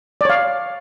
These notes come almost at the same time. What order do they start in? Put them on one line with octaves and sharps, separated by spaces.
D5 C#5 F5